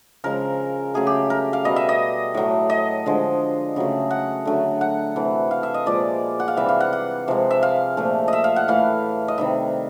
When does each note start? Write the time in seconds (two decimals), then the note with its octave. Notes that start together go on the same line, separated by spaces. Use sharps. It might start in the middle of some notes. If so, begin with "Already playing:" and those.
0.24 C#3 F3 G#3 A#4
0.94 C#3 F#3 A3 G#4
1.07 G4
1.30 A#4
1.53 F5
1.64 B2 G3 D#5
1.76 E5
1.89 D#5
2.34 A2 F#3 A3
2.70 D#5
3.06 D3 F3 G#3
3.76 C#3 F#3 A3
4.11 F#5
4.45 D3 F#3 A3
4.81 F#5
5.16 C3 E3 A3
5.51 F5
5.63 E5
5.74 D#5
5.86 A#2 F3 G#3 D5
6.40 F#5
6.48 F5
6.57 C3 E3 G3 E5
6.69 F5
6.80 F#5
6.93 F#5
7.28 C3 F3 G#3
7.51 E5
7.63 F5
7.97 A#2 F3 A3
8.28 D#5 E5
8.44 F5
8.56 F#5
8.68 A2 E3 A3 F5
9.28 D#5
9.38 C3 D#3 G3 E5